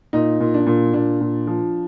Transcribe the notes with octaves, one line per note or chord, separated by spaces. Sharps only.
A#2 D#4
A#2
D4
A#2
A#2 D4
A#2
F3